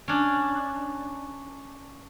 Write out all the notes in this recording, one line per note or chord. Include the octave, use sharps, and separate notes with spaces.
C#4 D4